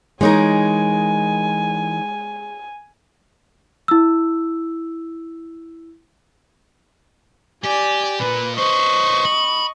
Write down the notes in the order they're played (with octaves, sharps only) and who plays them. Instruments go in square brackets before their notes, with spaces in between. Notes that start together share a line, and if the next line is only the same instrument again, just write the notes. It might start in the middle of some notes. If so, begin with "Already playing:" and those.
[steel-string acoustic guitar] E3 D#4 A#4 [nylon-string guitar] G#3 C#5 [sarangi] G#5
[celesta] E4 E6
[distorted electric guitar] G4 [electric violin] D5 G#5
[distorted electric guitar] A#2 A#3 [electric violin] B4
[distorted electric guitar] B4 C5 [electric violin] D#5 C#6
[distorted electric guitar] B5